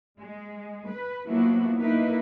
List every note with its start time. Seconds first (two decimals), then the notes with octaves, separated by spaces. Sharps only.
0.20 G#3
0.89 B4
1.27 F3 F#3 A#3 B3 E4 F#4
1.79 A#3 D#4 E4 A#4 B4